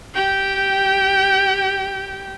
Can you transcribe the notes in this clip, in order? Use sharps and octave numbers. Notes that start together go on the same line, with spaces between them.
G4 G5